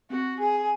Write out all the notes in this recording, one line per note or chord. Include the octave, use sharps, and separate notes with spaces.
C4 F#4
G#4